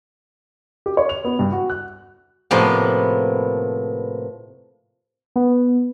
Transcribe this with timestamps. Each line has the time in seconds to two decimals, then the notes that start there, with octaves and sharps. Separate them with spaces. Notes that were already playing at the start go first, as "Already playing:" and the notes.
0.86 G4
0.97 C#5
1.09 F7
1.25 B3
1.39 G2
1.52 F#4
1.70 F#6
2.51 A2 C3 F3 A#3 B3
5.36 B3